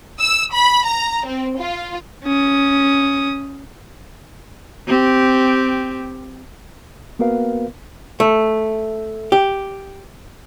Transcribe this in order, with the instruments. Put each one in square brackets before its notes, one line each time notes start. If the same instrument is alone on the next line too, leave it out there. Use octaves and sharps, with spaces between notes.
[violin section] E6
B5
A#5
C4
F4
[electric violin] C#4 D#6
[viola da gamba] C4 G4
[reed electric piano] A#3 B3 F#4 A#4 B4 F5
[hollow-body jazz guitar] A3
G4